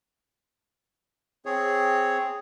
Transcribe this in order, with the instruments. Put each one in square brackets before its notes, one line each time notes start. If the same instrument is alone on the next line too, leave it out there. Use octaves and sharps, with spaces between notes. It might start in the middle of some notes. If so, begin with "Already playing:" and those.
[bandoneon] C4 G#4 C#5